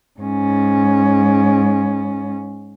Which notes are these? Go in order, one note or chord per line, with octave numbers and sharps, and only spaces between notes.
G#2 C#4